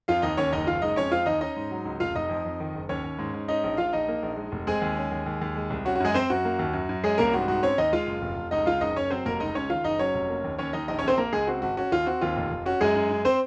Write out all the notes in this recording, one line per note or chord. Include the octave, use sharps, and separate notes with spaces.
F2 F4 F5
D#2 D#4 D#5
D#2 C#4 C#5
F#1 D#4 D#5
F#1 F4 F5
G#3 D#4 D#5
F2 C#4 C#5
C4 F4 F5
D#2 D#4 D#5
C#4 D#4 D#5
G#2
F#3
C#2
F1 F4 F5
F1 D#4 D#5
F2
F2
D#3
F#1
D#2 C#4 C#5
D#2
G#2
G#2
C#4 D#4 D#5
A#1
A#1 F4 F5
A#1 D#4 D#5
A#3
A#1
G#3
F1
G#3 C4 G#4
D#2
C#4
D#2
D#2
D#2
G#3
C2
C#4 F#4
F#4
F#2 G#3 G#4
C4 C5
F#2 F#4
A#3
D#2
F#2
F#2
G#3 C#4 G#4
C2 A#3 A#4
G#2 F#4
G#2 F#4
C4 C#4 C#5
D#2 D#4 D#5
G#3 F4 F5
F#1
F1
F1
C#2 D#4 D#5
C#2 F4 F5
F#1 D#4 D#5
F#1 C#4 C#5
F#3 C4 C5
F1 A#3 A#4
C#2 D#4 D#5
C#2 C#4 C#5
D#3 F4 F5
F#1 D#4 D#5
F#3 C#4 C#5
F1
A#3
D#2
D#2 C#4 C#5
D#2 D#4 D#5
A#1 D#4 D#5
A#1 C#4 C#5
C4 C5
A#3 A#4
C#2 G#3 G#4
C4 F#4
G#1 F#4
C#4 F#4
D#2 F4
C4 F#4
D#2 F4
F1
F1
C#4 F#4
F#2 G#3 G#4
F#2
F#2
C4 C5